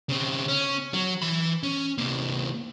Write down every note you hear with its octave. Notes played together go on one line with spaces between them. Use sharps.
C#3 C4
C#4
F#3
E3 B5
C#4
C3 A#3